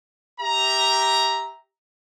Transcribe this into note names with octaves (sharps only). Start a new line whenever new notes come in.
G4 E5 A#5